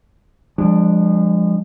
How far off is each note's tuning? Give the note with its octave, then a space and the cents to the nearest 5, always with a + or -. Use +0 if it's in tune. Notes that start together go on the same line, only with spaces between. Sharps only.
F3 +0 G#3 -30 D4 +0